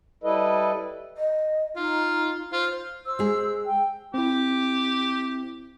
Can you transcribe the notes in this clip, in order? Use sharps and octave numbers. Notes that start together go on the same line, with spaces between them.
G3 E4 A4 B4 D#5
D#5
D#4 F4
F4 C5
C5 E6
G#3 G#4
G5
C4 E4 G4